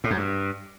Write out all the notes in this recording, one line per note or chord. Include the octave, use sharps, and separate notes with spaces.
A2
F#2
G2